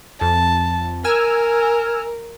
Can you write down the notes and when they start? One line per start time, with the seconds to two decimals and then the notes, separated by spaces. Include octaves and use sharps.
0.21 F2 A5
1.04 A#4 G#5 E6 F6